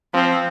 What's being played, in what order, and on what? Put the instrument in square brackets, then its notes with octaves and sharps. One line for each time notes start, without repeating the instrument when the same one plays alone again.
[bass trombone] F3 [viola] C4